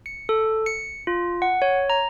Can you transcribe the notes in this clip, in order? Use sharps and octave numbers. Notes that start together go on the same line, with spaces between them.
C#7
A4
C#7
F4
F#5
C#5
A#5